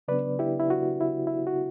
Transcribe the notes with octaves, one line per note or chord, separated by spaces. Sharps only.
C#3 F#3 B3 D4 B4 D5
E4 G4
E4
F#4
E4
E4
F#4